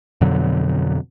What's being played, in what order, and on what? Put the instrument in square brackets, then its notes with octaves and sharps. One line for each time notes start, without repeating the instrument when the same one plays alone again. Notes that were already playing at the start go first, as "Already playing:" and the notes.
[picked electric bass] F2 B2 D3 F#3